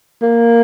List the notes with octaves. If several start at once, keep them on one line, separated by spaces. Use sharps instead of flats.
A#3